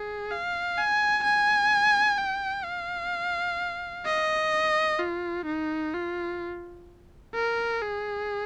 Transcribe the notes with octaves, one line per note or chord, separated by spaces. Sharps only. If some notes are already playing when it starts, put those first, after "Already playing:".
Already playing: G#4
F5
G#5
G#5
G5
F5
D#5
F4
D#4
F4
A#4
G#4